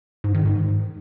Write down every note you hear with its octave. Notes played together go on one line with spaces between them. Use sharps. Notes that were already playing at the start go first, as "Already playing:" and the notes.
G#2
D#3
G#2